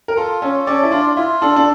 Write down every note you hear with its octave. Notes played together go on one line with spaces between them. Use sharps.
A#4
F4 A4
C#4 A4
C#4 D5
E4
D4 F4
E4 F4
D4 A4
D4